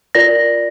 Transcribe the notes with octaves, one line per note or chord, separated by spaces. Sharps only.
F4 A#4 D5 A#6